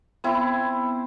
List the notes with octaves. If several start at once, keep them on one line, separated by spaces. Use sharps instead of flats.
B3 C4 E4 B5